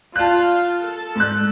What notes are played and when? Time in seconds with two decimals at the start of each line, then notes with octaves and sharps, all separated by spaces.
0.16 F4 A5 F#6
0.81 A4
1.16 G#2 F#6